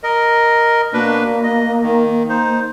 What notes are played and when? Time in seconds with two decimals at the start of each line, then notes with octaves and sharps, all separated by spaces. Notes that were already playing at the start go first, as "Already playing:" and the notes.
0.03 A#4 D#5
0.93 B2 A#3 D4 B4
1.43 D#5
1.83 D#3
2.29 D#4 C5